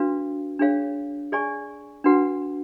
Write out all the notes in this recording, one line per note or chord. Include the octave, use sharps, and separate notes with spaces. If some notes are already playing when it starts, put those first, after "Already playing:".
Already playing: D4 F#4 B4 F5
D4 G#4 C#5 F5
G#4 D5 G#5 C#6
D4 F#4 B4 F#5